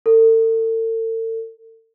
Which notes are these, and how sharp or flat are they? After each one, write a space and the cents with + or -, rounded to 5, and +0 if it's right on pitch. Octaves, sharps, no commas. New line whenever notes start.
A4 +40